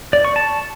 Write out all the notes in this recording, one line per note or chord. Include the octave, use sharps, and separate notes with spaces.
D5
C#6
A5